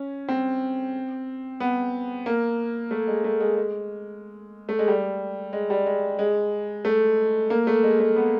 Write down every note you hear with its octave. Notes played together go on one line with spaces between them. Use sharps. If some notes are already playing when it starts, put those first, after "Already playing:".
Already playing: C#4
C4
B3
A#3
A3
G#3
A3
G#3
G#3
A3
G#3
G3
G#3
G3
G#3
G#3
A3
A#3
A3
G#3
A3
B3